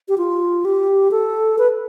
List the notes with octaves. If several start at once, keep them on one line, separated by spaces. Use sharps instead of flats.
G4
F4
G4
A4
B4